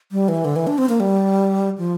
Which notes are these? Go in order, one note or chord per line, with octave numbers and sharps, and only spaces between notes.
G3
E3
D3
E3
D4
C4
A#3
G3
F3